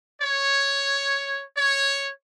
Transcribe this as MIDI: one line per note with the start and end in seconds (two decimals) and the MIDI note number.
0.22 1.42 73
1.56 2.08 73